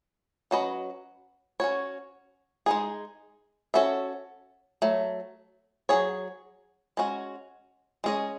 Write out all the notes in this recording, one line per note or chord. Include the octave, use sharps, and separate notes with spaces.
F#3 C#4 F#4 B4 D#5
C#4 F#4 C#5
G#3 D#4 G#4
C#4 F#4 A4 E5
F#3 A3
F#3 C#4 G#4 C#5
G#3 C#4 F#4
G#3 C#4 G#4 D#5